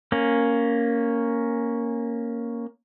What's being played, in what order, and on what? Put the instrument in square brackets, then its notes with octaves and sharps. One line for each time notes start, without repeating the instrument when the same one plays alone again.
[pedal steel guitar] A#3 C#4